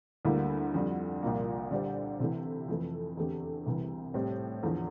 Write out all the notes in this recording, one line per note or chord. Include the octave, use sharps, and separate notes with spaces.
D2 D3 G3 A#3 E4
F2 D3 G3
C2 A#2 F3 A#3
D3 G3 D4 G4 C5
C3 E3 A3 E4
F2 E3 A3
E2 D3 A3 C4 G4
C2 C3 E3
A2 G3 C4 G4 C5
E2 D3 F3 A3 E4